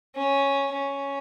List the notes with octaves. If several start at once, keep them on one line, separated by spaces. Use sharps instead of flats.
C#4
C#4